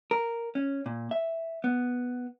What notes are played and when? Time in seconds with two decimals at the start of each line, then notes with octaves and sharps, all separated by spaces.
0.11 A#4
0.55 C#4
0.86 A#2
1.11 E5
1.64 B3